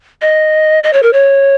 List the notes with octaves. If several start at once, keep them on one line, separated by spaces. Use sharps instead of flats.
D#5
D#5
C#5
A#4
C#5